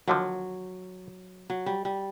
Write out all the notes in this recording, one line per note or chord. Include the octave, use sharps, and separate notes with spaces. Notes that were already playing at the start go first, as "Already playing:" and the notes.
D#2 D3 F3 F#3
F#3
G3
G3